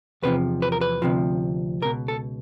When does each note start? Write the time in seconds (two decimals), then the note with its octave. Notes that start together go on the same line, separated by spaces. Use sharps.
0.22 E2 C3 F3 B4
0.62 B4
0.72 A#4
0.81 B4
1.02 D2 C3 F3
1.82 C#2 B2 A#4
2.08 A4